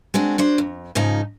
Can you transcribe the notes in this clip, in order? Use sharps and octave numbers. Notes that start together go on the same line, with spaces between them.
G#3 C4 D4 F#4
F#3 D4 C5
F2
G#2 C#3 F3 D#4